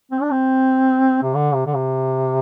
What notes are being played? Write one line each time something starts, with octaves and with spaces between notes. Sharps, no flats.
C4
D4
C4
C3
D3
C3
D3
C3